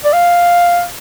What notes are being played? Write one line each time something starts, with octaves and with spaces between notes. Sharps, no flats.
D5
F5